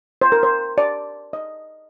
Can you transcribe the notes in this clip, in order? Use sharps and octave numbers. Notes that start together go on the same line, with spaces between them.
C5
A#4
C5
D5
D#5